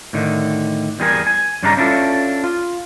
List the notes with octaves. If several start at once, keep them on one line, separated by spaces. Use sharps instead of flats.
A2 D3 D#3
E2 G3 G#4 A#4 G#5
G#5
G2 C#3 G3 D4 D#4 A#5
C#4 D4 E4 F4 A4
F4